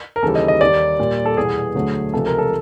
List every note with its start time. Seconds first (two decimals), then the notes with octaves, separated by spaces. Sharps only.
0.16 A#4
0.22 D#2 C#3 E3 G3 A4
0.35 D#5
0.48 D#5
0.61 D#2 D#3 G3 D5
0.99 A#2 G3
1.26 A4
1.37 E2 B2 G3 G#4
1.75 D2 D3 F#3 A3
2.13 C#2 C3 F3 G#3 A4
2.26 A#4
2.38 A4